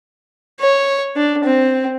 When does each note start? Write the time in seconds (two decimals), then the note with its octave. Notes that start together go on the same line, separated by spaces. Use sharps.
0.60 C#5
1.16 D4
1.44 C4